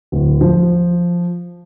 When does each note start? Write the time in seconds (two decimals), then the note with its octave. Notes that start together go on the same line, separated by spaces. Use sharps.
0.12 D1
0.41 F3